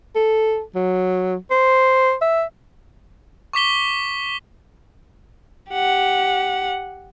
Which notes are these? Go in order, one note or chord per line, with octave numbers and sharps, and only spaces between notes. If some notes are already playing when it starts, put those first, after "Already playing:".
A4
F#3
C5
E5
C#6 D6 B6 G7
G4 F#5